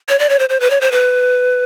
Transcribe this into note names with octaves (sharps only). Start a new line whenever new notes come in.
C#5
D5
C#5
C5
C5
B4
C#5
C5
B4